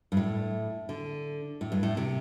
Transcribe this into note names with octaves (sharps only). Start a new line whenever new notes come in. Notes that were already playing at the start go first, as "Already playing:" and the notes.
G2
A2
D3
A2
G2
A2
C3